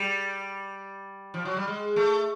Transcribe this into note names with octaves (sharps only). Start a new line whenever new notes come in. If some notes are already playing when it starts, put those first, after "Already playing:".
Already playing: G3
F3
F#3
G3
G#3
A3